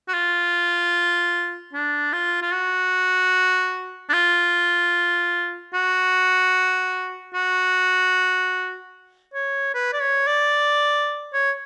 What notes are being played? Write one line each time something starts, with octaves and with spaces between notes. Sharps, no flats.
F#4
F4
D4
F4
F4
F#4
D4
F4
F#4
F#4
C#5
B4
D5
C#5
D5
C#5